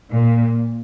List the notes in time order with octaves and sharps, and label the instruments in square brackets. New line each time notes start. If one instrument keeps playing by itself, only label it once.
[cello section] A#2